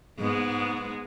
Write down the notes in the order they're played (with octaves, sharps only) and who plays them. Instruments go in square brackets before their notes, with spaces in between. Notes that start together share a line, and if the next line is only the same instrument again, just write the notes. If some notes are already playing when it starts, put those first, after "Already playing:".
[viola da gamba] G#2 G#3 B3